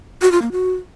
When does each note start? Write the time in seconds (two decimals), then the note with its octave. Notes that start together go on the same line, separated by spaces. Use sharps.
0.22 F#4
0.32 F4
0.42 A#3
0.52 F#4